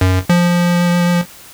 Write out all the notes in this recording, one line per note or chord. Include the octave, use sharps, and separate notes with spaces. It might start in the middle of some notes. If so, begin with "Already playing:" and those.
F#2
F3